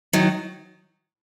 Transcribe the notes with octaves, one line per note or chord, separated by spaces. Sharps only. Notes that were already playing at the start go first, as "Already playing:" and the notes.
D#3 F#3